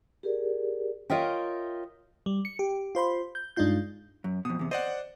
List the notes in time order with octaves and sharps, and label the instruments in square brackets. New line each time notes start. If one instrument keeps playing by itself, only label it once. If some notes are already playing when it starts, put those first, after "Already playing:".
[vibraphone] G4 G#4 A#4 D5
[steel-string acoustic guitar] F4 A#4 C#5 D#5 E5 G5
[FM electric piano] G3
C#7
G4
F4 C5 B5 C6
G6
G2 G#3 D4 D#4 F4 G6
[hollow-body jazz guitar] F#2
[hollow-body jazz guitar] F2 B2 [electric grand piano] D#6
[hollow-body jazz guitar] E2 C3
[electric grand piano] C5 D5 F#5 [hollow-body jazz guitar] D#5